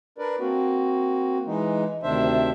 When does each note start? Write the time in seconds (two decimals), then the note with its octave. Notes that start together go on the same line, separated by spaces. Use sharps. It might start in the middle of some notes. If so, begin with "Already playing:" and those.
0.18 D4 A#4 B4 D5
0.39 A#3 C4 F#4
1.46 E3 G#3 D#4
2.03 D2 C3 D#3 D4 C5 E5